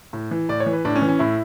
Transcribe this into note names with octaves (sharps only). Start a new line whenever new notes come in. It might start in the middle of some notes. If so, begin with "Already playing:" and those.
A2
E3
A2 D5
C#5
E3
B4
A2 D4
C#4
E3
C#4
A2 E4